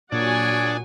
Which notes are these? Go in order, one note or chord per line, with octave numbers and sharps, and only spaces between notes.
A#2 F#3 D4 G#4 C#5 D5 F#5 G#5